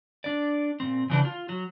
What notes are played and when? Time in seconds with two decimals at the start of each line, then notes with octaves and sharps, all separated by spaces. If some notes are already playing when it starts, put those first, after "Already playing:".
0.24 D4 D5
0.80 A#2 C4
1.10 C#3 E3 D4
1.25 F4
1.49 F#3